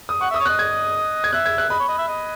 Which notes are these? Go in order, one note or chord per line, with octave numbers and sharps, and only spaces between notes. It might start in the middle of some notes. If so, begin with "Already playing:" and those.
D#6
F#5 C#6
E5 D#6
C#5
D#5 F#6
G#6
G#6
E5 F#6
G#6
F#6
D#5 B5
C#5
D#5
E5
D#5